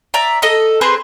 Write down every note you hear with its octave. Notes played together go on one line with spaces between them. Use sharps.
D5 E5 A#5
A4 D#5 D#6
C4 G#4 B4 C5